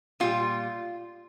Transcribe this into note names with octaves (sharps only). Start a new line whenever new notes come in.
A#2 G3 F4